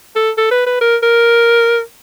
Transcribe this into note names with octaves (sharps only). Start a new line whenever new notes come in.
A4
A4
B4
B4
A#4
A#4